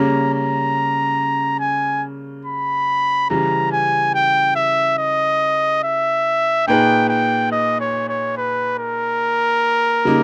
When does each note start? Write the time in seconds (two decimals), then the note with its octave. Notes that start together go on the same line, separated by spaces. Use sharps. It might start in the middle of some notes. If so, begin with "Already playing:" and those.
Already playing: C#3 G3 A#3 C#4 A#5
0.34 A#5
1.60 G#5
2.45 B5
3.30 C#3 E3 G3 A#5
3.72 G#5
4.15 G5
4.56 E5
4.98 D#5
5.84 E5
6.67 A#2 A#3 D#4 G#4 B4 G5
7.09 G5
7.52 D#5
7.80 C#5
8.09 C#5
8.37 B4
8.79 A#4
10.05 C#3 G3 A#3 D#4